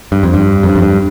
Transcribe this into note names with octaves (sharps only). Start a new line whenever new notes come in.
G2
F2
G2
F2
G2
F2
G2